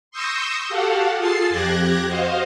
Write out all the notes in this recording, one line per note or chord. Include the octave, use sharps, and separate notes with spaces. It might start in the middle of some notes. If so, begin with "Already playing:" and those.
C6 C#6 D#6 E6 G6 A#6
F#4 G4 A4 F5 F#5
F4 G#4 A4 A6 C7
F2 G4 F#6 G#6 A#6
F#4 C5 D#5 F5